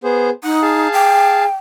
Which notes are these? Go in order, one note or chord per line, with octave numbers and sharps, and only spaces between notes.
B3 G#4 C5
D#4 F#5
G#4 F5 A5
G5